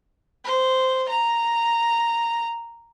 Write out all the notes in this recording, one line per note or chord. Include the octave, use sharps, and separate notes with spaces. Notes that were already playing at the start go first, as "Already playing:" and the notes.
C5
A#5